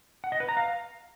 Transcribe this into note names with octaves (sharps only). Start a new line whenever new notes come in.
F#5
D#5
B4
A#5
F5